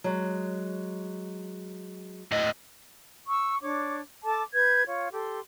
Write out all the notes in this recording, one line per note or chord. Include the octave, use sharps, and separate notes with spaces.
F#3 G#3
A2 D#5
C#6 E6
D4 C#5 D6
A4 A5 D6
B4 G6 G#6
F4 C#5
G4 A4 C6